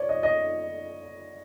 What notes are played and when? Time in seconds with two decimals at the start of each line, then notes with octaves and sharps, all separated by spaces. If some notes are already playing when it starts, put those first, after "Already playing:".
Already playing: C#5 D5
0.09 D#5
0.23 D#5